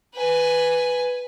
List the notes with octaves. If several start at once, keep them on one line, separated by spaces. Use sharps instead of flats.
B4 G#5